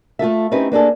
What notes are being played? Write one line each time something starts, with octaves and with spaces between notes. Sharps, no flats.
A3 F4 A4 E5
C4 C#4 D#4 E4 G4 B4
A#3 D4 G#4 A4